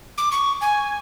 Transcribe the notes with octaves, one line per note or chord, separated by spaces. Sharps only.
D6
C#6
G#5